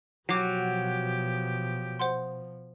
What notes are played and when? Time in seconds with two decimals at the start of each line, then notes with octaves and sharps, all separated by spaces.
0.29 B2 F3 F#3 G4 D6 C7
1.99 C5 F#5 C6